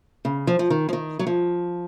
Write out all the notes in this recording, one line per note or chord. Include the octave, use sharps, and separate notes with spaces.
C#3
F3
F3
D#3
F3
D#3
F#3
F3